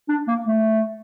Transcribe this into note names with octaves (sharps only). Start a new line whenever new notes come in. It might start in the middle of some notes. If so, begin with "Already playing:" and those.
D4
A#3
A3